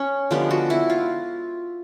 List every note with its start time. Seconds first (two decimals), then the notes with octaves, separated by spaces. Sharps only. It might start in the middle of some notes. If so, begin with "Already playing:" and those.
Already playing: C#4
0.31 D3 F3 G#3 B3 G4
0.51 F#4
0.70 E4
0.90 F4